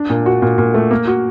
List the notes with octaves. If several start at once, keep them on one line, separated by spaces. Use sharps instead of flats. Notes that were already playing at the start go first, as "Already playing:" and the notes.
Already playing: D4
A#2
F#4
A#2
A#2
A3
A#3
F#4